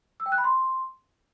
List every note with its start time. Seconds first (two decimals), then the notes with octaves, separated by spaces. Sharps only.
0.20 E6
0.26 G5
0.32 F#6
0.38 B5
0.44 C6